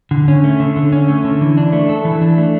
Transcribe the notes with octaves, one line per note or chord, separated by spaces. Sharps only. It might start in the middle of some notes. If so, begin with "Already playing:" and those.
D3
C#4
A3
D3
D3
C#4
A3
D3
E3
D4
A3
A4
E3
D4
A3